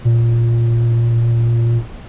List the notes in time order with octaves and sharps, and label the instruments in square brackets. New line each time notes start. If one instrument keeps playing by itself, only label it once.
[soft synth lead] A#2